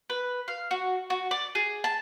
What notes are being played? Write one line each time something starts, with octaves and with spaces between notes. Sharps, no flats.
B4
F5
F#4
F#4
D5
G#4
A5